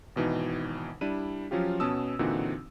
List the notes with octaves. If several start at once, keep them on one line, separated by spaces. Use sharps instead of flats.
G#1 B2 E3 D#4
G3 D4 E4 D#7
F3 F#3 C#4 F4 G4
B2 B3 C#4 A5 D#6 E6
A#2 D3 E3 C4 D#4 F#4